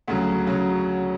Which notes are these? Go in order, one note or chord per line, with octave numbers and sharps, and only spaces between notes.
D2 C#3 F#3
C#3 F#3